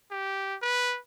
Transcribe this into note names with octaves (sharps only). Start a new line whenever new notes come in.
G4
B4